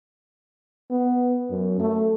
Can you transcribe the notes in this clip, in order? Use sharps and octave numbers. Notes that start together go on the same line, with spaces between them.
B3
F#2
A3